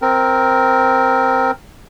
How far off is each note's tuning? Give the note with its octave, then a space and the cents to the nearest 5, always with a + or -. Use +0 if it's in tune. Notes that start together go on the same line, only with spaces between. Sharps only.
C4 +0 A#4 +0